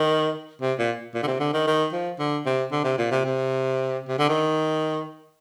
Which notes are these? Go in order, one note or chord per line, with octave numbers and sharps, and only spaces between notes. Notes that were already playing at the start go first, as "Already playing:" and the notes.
Already playing: D#3
C3
A#2
A#2
D3
C3
D3
D#3
D#3
F3
D3
C3
D3
C3
A#2
C3
C3
C3
D3
D#3